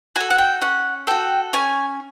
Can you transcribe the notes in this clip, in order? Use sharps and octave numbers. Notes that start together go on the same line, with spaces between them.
F#4 A4 G#5
F#5
G5
C#4 F#5
F#4 A4 G5
C#4 G#5